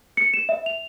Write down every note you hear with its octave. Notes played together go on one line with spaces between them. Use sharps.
C#7
E7
E5
F7